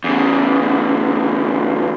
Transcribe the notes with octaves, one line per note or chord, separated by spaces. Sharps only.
E2 C#3